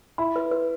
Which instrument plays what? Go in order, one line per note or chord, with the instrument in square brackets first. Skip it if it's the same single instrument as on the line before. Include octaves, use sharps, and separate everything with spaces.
[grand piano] E4 [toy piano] B5
[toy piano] B4
B4